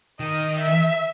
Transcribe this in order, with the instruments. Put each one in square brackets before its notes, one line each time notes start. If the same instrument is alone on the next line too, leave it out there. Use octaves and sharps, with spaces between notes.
[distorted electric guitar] D#3 [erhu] D#5
[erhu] E5